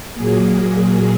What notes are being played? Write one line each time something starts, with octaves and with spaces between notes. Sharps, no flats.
A#2 F#3 A#3 G#4